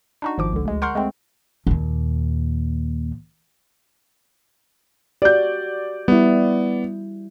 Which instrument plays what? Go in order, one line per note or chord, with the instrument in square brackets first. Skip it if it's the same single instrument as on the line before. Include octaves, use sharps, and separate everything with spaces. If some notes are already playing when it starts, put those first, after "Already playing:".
[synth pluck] D4 D#4 F#4
G#1 F3 D6
C#2 D3
D2 G#3
A#4 F#5 C6 C#6 F6 G6
G#3 A3 C4
[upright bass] D#2 A#2
[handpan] F#4 G4 [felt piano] D5 G6
[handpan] G3 E4 [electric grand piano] B3